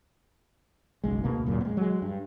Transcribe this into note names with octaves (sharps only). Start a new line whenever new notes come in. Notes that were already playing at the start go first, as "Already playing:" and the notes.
F#1 B1 G#3
D2 B2 A#3
D1 F#2 A#2 C#3
G#3 B3
F#3 G#3
G2